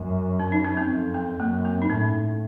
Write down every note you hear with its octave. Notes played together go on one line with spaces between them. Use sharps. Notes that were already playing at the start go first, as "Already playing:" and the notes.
Already playing: F#2
C#4
D#4
C#4
C4
F2
C4
F#2 A#3
C4
D#4
A2 C#4